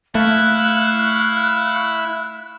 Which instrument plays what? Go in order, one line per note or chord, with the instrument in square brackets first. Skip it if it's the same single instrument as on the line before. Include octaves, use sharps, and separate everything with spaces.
[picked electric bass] A3 [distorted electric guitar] E4 [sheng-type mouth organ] F5 C#6 [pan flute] F#6